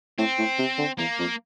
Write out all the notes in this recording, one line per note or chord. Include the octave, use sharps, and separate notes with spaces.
A2 C4
A2
C3
D3
E2 A#3
F2